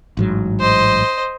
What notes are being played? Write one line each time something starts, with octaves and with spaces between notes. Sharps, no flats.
A1 G#2 F#3
C5 D#5